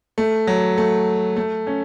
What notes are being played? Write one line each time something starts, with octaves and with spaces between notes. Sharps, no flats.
A3
F#3
A3
A3
C#4